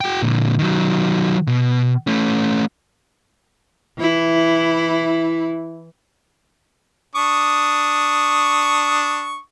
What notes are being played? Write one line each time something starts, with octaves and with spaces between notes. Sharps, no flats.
F#4 G5
A#2 D3
D#3 F#3
B2
A3 C#4
E3 E4
D4 C#6 D#6